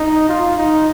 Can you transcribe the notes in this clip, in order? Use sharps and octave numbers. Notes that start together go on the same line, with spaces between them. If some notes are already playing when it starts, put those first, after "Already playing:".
Already playing: D#4
F4
D#4